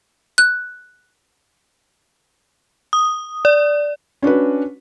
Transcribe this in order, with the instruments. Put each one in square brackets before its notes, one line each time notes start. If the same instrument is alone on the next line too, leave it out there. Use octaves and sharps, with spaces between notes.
[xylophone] F#6
[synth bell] D#6
D5
[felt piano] C#4 D4 F#4 B4